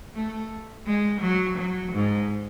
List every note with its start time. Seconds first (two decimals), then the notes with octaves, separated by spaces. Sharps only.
0.15 A3
0.86 G#3
1.21 F#3
1.58 F#3
1.93 G#2